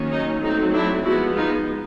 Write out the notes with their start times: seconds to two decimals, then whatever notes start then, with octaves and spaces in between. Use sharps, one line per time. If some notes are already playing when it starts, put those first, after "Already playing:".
Already playing: D#3 F#3 A#3 C#4
0.12 D#4
0.42 F#3 A3 C4 D#4
0.73 D4 E4
1.04 F3 G#3 B3 E4 F#4
1.36 D#4 F4